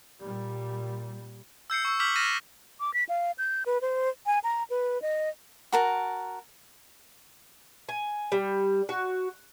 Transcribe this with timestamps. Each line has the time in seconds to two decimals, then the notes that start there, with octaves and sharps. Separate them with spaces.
0.22 A#2 G3
1.70 E6 G6 C7 C#7
1.85 C#6 E6
2.00 D6 F6 G6 B6 F#7
2.16 F6 A6 A#6 D#7 E7
2.80 D6
2.94 B6
3.09 F5
3.38 G6
3.66 B4
3.81 C5
4.26 G#5
4.44 A#5
4.70 B4
5.02 D#5
5.72 F#4 A#4 A5
7.89 G#5
8.32 G3
8.89 F#4